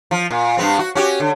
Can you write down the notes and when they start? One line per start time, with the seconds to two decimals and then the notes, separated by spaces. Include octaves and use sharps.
0.11 F3
0.31 A#2
0.57 G2 B3 C4
0.79 F#4
0.95 C#4 F#4 G4
1.20 D3